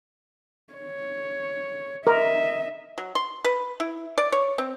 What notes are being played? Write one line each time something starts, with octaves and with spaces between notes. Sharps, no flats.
C#5
A#4 D#5 E5
F#3
C6
B4
E4
D5
C#5
C4